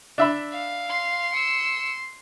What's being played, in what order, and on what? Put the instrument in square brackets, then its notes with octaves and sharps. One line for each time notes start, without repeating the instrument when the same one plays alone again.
[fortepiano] D4 E5 B5
[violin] F5
[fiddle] C6
[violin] E6 C#7